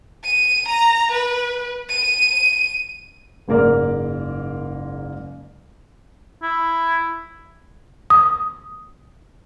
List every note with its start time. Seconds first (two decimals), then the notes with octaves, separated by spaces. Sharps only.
0.24 D#7
0.68 A#5
1.12 B4
1.89 D#7
3.48 F#1 G#2 A#3 A#4 D5
6.43 E4
8.10 D#6